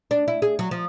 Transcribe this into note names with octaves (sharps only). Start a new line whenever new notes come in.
D4
E4
G#4
F#3
F3